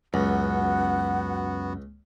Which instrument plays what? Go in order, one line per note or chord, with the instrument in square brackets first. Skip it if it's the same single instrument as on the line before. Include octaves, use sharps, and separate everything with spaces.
[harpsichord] C#2 [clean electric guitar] F#2 [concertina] B3 F#4 [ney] F#5